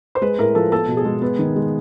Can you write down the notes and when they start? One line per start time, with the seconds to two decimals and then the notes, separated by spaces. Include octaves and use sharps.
0.15 C5
0.22 G#3 B4
0.38 A2 A#4
0.55 F3 A4
0.72 B3 A4
0.88 B2
0.97 G#4
1.05 G#3
1.22 B3
1.39 D#3
1.56 G#3